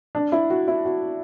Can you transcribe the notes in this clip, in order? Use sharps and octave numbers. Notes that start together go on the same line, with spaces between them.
D4
E4
F#4
E4
F#4